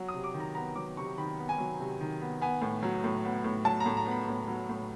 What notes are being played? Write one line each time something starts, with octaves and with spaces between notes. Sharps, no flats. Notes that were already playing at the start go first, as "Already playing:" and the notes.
Already playing: F#3
D#6
C3
D6
D#3
A#5
B3 A#5
F#3 D6
C3 C#6
D#3 B5
B3
G#5
F#3
C3
D#3
B3
B3 G#5
A2
F#3
A2
B3
A2
F#3 A5
A#5
A2
A#5
B3
B5
A2
F#3
A2